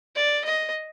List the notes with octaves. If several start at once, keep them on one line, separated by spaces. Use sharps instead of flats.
D5
D#5